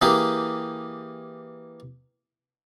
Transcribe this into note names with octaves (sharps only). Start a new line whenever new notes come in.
E3 A#3 G4 G#4